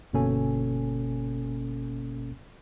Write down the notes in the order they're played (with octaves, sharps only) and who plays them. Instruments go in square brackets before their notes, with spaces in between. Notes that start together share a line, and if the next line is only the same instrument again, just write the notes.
[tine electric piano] G1 B2 A#3 C#4 A4 G#5